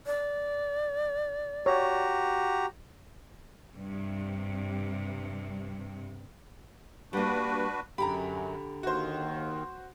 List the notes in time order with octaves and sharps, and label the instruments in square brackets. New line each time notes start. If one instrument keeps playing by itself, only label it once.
[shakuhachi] D5
[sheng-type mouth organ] F#4 G4 A#5 [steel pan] C#5
[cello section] G2 C3
[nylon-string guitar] G3 A#3 [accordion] D4 F#4 B4
[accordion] F#2 [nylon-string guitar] D3 G4 [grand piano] A#5 B5
[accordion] D#2 D#3 [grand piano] F#4 C5